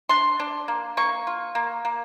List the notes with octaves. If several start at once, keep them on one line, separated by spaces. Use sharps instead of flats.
D4 C6
D4
A#3
A#3 C#6
F4
A#3
A#3